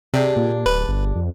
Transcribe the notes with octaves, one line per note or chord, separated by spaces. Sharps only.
C3 D4 G4 G#4
A#2
D1 B4
G1
F2